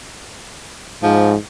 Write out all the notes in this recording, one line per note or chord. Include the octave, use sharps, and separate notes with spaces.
G#2 F3